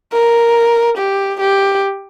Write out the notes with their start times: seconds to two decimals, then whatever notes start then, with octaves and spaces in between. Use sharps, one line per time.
0.13 A#4
0.98 G4
1.41 G4